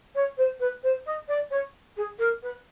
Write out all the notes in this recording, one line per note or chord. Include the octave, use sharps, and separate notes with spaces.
C#5
C5
B4
C5
D#5
D5
C#5
G#4
A#4
B4